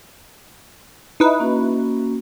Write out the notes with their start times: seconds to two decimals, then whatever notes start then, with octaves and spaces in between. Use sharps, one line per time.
1.20 D#4 E4 B4 D#6
1.40 A#3 C#4 F#4